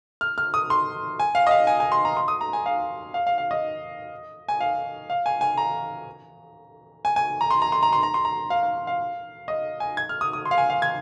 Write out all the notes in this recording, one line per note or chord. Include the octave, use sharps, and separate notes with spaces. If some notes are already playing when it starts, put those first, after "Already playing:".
F6
F6
D#6
C6
G#5
F5
D#5
F5
G#5
G#5
C6
A#5
C6
D#6
A#5
G#5
F5
F5
F5
F5
D#5
G#5
F5
F5
G#5
G#5
A#5
G#5
G#5
A#5
C6
A#5
C6
A#5
C6
A#5
C6
A#5
F5
F5
F5
D#5
G#5
G#6
F6
D#6
D#6
C6
F5
G#5
F5
G#6